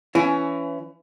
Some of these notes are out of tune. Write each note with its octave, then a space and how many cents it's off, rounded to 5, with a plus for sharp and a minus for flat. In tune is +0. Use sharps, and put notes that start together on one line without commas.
E3 +25 C#4 +25 E4 +30